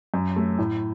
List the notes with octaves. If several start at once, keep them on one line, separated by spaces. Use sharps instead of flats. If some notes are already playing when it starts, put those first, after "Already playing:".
F#2
A3
A2